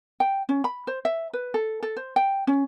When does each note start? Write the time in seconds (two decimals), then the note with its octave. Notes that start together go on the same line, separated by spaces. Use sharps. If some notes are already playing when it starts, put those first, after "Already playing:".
0.20 G5
0.49 C#4
0.64 B5
0.87 C5
1.05 E5
1.33 B4
1.54 A4
1.83 A4
1.97 C5
2.16 G5
2.47 C#4